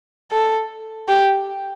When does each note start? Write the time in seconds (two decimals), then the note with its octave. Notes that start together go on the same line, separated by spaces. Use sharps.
0.32 A4
1.08 G4